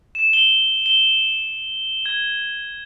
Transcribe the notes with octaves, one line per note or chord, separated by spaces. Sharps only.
E7
G7
G7
G#6